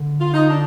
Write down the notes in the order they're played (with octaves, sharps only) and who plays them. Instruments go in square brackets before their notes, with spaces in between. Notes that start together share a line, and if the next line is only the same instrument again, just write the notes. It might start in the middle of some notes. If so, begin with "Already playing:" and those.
Already playing: [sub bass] D3
[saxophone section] F4
D#4
D4